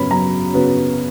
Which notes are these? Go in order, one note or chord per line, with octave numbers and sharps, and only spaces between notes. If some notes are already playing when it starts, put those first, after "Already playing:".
Already playing: F#2 C#3 F#3 B3 C#5 B5
F#2 A#5
C#3 F#3 B3